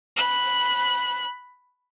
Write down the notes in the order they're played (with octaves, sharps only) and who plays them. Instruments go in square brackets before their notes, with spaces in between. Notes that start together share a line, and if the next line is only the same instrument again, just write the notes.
[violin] B5 F#6